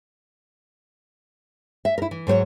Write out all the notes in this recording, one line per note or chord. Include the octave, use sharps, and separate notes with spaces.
E5
E4 A#4
E3
G#2 F#3 C5 C#5